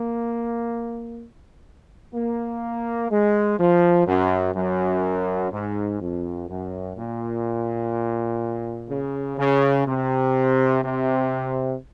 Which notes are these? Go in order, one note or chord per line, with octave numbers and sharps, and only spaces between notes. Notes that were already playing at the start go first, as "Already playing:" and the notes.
Already playing: A#3
A#3
G#3
F3
F#2
F#2
G#2
F2
F#2
A#2
C#3
C#3
C3
C3